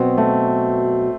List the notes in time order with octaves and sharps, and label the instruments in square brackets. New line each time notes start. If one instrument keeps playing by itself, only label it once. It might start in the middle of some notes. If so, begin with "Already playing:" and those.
Already playing: [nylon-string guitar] B2 F#3 B3 [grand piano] C4
[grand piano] A3